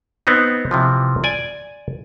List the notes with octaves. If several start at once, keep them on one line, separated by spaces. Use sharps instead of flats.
B3 C4 D#4
C3 E3 F3
D5 G#5